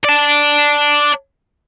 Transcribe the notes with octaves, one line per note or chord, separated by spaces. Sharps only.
D5 A5